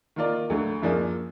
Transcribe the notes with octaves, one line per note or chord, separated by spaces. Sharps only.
D#3 A#3 F4 A#4 D5
D2 D3 F#3
F#2 F3 A#3 D4 G#4